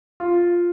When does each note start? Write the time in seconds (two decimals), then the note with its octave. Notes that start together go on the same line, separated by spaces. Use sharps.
0.20 F4